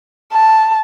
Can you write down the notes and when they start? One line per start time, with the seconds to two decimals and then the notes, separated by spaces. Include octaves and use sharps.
0.32 A5